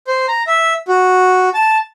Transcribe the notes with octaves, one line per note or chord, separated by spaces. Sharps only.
C5
A#5
E5
F#4
A5